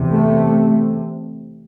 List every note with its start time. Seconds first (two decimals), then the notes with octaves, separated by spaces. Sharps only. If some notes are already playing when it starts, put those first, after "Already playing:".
Already playing: E2 C3
0.13 A3